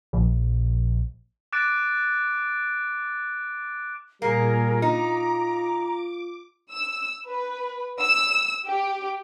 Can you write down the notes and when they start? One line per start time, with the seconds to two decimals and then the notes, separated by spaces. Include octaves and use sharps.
0.13 A#1
1.53 D6 F#6 A6 D7
4.22 A#2 G3 A#3 G#4 A#4
4.82 D#4 F4 A#5 D6
6.71 E6
7.27 B4
8.01 E6
8.66 G4